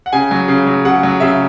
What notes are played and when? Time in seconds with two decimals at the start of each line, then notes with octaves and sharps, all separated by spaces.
0.06 F#5
0.13 C#3 G#5
0.31 F#3
0.48 C#3
0.66 F#3
0.85 C#3 F#5
1.03 F#3
1.20 C#3 E5